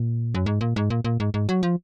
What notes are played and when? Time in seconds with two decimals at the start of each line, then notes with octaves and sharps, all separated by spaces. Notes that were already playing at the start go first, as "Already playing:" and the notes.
Already playing: A#2
0.35 F#2
0.46 G#2
0.61 A#2
0.76 G#2
0.90 A#2
1.05 A#2
1.20 G#2
1.34 G#2
1.49 F#3
1.63 F3